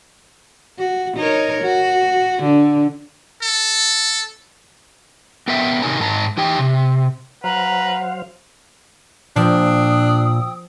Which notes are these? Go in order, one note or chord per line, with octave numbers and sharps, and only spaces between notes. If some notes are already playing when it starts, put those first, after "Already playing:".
F#4
D#4 A#4 C#5
F#4
D3
A4
B3 A#4 E5 G5
C3 D#4 A#4 G#5 A#5
G#2 A5 A#5
E3 D#4 G4 G5
C3
F#3 B4 C5 F5 F#5 A#5
A#2 F3 D4 G5 D#6 E6